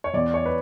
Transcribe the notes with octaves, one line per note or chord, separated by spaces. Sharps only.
C#5
E2 D5
C#5
B4